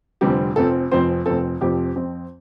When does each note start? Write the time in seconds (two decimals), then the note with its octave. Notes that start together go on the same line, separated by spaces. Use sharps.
0.21 F1 F2 D3 G3 C4 G4
0.56 F1 F2 F3 C4 A4
0.91 F1 F2 F3 C4 C5
1.26 F1 F2 F3 C4 A4
1.61 F1 F2 F3 C4 G4
1.95 F2 F3 C4